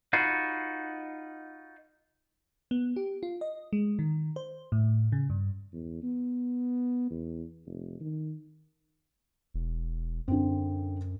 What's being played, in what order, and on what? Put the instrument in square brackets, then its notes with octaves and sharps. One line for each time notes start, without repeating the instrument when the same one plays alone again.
[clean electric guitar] D#4 F4 F#4 B4
[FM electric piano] B3
G4
F4
D#5
G#3
D#3
C5
A2
C#3
G2
[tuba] E2
B3
E2
F1
D#3
[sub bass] E1
[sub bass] F#2 [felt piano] D3 C4